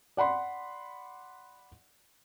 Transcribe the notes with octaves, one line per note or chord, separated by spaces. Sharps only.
D5 F#5 B5 C6